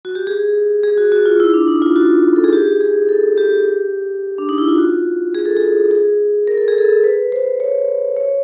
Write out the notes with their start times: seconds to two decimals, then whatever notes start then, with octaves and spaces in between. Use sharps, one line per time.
0.05 F#4
0.15 G4
0.27 G#4
0.83 G#4
0.97 F#4
1.12 F#4
1.26 F4
1.40 E4
1.54 D4
1.68 D#4
1.82 F4
1.96 F#4
2.36 A4
2.44 G#4
2.53 G4
2.81 G#4
3.09 A4
3.38 G4
4.38 D4
4.49 D#4
4.58 E4
4.68 F4
4.78 F#4
5.35 G#4
5.45 A4
5.57 G#4
5.91 G#4
6.48 A#4
6.57 A4
6.68 G#4
6.78 A4
7.04 B4
7.32 C5
7.60 C#5
8.17 C#5